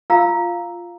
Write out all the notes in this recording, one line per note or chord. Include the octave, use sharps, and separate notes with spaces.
F4 F5 A#5 E6